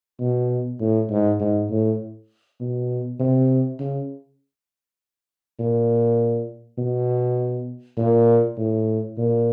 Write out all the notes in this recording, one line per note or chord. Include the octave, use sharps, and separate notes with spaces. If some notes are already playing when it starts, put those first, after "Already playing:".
B2
A2
G#2
G#2
A2
B2
C3
C#3
A#2
B2
A#2
A2
A#2